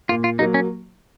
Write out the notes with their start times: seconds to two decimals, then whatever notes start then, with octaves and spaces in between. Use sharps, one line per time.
0.09 A#2 F4
0.24 F4
0.39 F#3 A#3 D#4
0.54 C#4